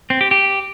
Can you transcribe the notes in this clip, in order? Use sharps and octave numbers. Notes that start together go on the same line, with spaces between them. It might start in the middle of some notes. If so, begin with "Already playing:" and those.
C4
G4
G4